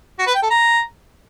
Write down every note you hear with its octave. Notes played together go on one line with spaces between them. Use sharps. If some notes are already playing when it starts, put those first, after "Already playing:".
F#4
B4
G5
A4
A#5